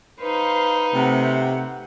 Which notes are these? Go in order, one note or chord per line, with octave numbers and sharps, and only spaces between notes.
D#4 B4 C5 F5
C3 A3 F#5